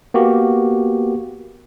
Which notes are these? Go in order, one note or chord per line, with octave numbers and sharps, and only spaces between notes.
A#3 B3 F#4 G4